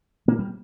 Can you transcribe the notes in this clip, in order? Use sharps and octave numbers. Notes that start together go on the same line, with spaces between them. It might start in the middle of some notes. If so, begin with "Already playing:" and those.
A#2 A#3
G3